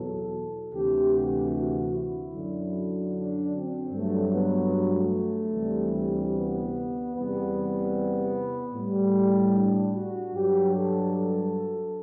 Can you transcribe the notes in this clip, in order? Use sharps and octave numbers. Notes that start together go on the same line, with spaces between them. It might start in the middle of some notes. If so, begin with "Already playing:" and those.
Already playing: E2 B2 F#3 A4
D2 C3 E3 G4
F#4
F#4
E4
F#2 D3 F#3
D4
C4
G2 F#3 A3
B3
A3
D2 C3 E3 G3
B3
E2 C3 G3 B3
A2 G3
D4
F#4
G2 F#3 G4
A4
A4